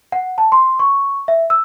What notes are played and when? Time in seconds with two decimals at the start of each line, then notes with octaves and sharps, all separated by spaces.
0.12 F#5
0.38 A5
0.52 C6
0.79 C#6
1.28 E5
1.50 E6